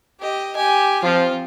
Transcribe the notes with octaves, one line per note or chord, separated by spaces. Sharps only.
G4 D#5
G4 G#5
F3 C4 F4